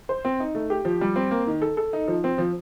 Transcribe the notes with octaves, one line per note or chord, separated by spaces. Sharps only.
C5
C4
D#4
A3
G4
F3
G3
C4
A#3
D#3
A4
A4
D#4
F3
C4
F3